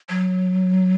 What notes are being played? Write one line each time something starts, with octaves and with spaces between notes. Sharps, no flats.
F#3